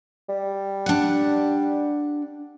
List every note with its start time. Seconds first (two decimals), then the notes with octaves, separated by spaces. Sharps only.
0.29 G3
0.86 D4 F#5